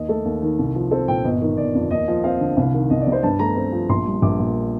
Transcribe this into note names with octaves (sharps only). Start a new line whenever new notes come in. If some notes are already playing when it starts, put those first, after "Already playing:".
Already playing: D#2 D#5
A3 A4
D#2
D#3
C2
F3
C4 A4
A#2 G5
G1 D#5
D#3
G1 D5
F2
D#2 D#5
F3
C4 F5
D3
C2 F5
D#3
C2 D#5
D5
C3
C5
G2 A5
A3 A#5
C4
F3
A#1 C6
G3
A#1 D6
A#2